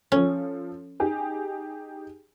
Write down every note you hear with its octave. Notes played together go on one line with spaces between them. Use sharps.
F3 C#4 A4
D#4 G4 G#4